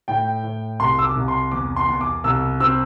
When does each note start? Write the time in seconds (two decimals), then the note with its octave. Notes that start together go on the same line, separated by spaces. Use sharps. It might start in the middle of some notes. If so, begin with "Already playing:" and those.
0.08 A2 G5
0.44 A2
0.80 C2 C6
0.99 E6
1.04 D6
1.15 C2
1.28 C6
1.52 E2 D6
1.76 C6
1.88 E2
2.01 D6
2.24 C2 E6
2.60 C4 E6